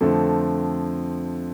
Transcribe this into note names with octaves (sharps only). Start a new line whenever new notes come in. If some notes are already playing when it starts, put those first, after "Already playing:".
F2 D3 F3 A3 C4 A4